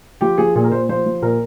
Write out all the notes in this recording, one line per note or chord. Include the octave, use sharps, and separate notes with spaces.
F3 G4
F3 G#4
A#2 G#4
A#4
A#2 C5
F3 C5
F3
A#2 A#4